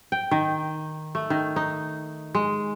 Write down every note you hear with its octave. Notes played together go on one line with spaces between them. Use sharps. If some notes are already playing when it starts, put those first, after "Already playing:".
G5
D#3
A3
D#3
D#4
G#3